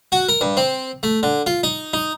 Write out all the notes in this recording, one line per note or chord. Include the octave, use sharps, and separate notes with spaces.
F#4
A#4
G2
C4
A3
D3
F4
D#4
D#4